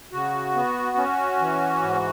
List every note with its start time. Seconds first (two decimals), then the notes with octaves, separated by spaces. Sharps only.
0.12 C#3 F#4
0.55 B3
0.97 C#4
1.40 E3
1.82 G#2